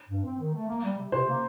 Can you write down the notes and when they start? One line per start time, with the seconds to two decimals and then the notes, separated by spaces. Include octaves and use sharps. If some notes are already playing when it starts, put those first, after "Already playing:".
0.08 G2
0.23 C4
0.39 D#3
0.53 A3
0.68 A#3
0.83 G3
0.97 C3
1.12 C3 C5
1.27 A#3